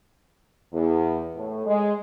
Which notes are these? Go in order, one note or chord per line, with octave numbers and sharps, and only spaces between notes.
E2
A2
G#3